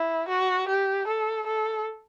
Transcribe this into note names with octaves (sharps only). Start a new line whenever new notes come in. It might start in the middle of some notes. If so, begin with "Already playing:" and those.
Already playing: E4
F#4
G4
A4
A4